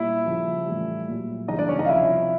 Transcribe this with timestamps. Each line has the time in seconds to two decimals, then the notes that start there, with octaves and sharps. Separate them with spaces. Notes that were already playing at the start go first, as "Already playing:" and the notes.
Already playing: A#2 G3 E4 E5
0.25 C#3 F3
0.66 A2 E3 G3
1.08 A#2 F#3
1.48 C#3 E3 G3 D#4 D#5
1.58 D4 D5
1.69 C#4 C#5
1.79 D#4 D#5
1.85 F5
1.89 C3 F3 E4 E5